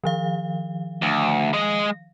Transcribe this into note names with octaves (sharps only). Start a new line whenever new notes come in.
D#3 F3 F5
D2
G#3 D#5